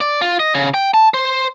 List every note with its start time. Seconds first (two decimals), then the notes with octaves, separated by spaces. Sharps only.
0.01 D5
0.21 F4
0.39 D#5
0.55 C#3
0.74 G5
0.94 A5
1.14 C5